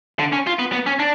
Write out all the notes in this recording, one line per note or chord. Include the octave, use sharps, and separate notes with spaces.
D3
C#4
F4
B3
B3
C#4
D4